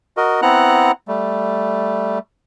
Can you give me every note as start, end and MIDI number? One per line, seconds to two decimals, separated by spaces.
0.17 0.41 66
0.17 0.41 70
0.17 0.41 75
0.42 0.92 59
0.42 0.92 60
0.42 0.92 64
0.42 0.92 78
0.42 0.92 82
0.42 0.92 90
1.08 2.19 55
1.08 2.19 57